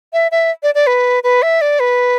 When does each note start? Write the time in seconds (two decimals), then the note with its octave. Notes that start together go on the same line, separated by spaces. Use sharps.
0.13 E5
0.31 E5
0.63 D5
0.75 D5
0.87 B4
1.23 B4
1.42 E5
1.61 D5
1.80 B4